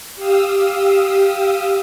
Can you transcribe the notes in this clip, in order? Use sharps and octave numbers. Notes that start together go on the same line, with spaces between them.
G4 F5 D#6 E6